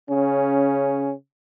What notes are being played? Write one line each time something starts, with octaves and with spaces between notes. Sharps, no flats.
C#3 C#4